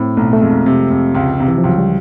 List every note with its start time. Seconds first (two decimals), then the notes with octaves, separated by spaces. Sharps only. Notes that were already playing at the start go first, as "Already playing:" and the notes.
Already playing: A2 C4
0.17 B1 A3
0.33 A3
0.41 F2 G#3
0.66 C3
0.90 F2
1.15 C#2
1.40 C3
1.48 E3
1.58 F3
1.64 C#2 F#3
1.78 G3